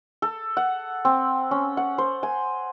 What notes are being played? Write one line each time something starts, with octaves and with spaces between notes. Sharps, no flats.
A4
F#5
C4
C#4
F#5
C5
G#5